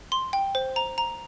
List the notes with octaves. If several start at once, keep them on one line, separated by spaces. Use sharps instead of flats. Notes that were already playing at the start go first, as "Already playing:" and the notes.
C6
G5
C5
A#5
A#5